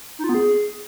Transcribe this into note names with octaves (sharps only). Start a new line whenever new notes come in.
D#4
F4
B3
G#4